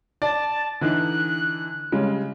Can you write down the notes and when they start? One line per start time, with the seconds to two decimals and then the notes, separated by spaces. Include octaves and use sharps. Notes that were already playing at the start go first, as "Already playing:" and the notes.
0.22 D5 A5
0.81 D3 E3 D#4 F#6
1.92 C#3 G3 G#3